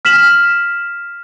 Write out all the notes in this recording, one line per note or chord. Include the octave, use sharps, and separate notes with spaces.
F6 B6 E7 F#7